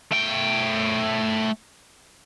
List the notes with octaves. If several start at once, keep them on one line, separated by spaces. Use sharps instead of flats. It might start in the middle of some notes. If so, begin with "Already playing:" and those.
A3 G5